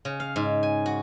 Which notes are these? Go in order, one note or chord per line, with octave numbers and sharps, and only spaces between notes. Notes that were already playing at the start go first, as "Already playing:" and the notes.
C#3
F5
G#2
G#5
F#4